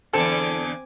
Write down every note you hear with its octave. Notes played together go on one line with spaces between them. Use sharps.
E2 D3 C4 A4 G5 G#5 D6